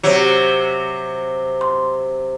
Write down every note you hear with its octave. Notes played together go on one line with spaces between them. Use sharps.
C3 F#3
C6